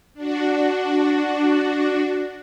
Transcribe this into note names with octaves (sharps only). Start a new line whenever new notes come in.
D4 F#4